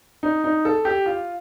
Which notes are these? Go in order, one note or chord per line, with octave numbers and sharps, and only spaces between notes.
D#4
D#4
A4
G4
F4